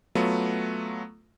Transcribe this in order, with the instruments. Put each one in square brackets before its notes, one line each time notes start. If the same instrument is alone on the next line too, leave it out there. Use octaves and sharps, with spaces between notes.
[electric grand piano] F#3 A3 B3 F4